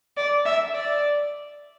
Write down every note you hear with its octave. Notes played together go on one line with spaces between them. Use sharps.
D5
E5
D5